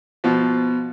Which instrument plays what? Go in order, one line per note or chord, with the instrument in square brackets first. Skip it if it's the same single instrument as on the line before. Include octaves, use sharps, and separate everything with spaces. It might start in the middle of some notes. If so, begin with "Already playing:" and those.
[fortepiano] B2 F3